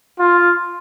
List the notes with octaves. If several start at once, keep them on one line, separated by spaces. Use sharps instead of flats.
F4